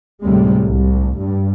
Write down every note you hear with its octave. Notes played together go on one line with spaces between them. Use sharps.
D2 A2 C3 G3 G#3
C2
G2